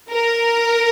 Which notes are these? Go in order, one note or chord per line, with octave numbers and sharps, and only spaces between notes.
A#4